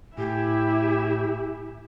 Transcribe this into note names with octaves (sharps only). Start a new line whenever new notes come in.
A2 E4 G4 E5 G#5